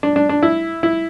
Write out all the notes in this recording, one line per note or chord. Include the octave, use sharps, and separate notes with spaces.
D4
D4
D4
E4
E4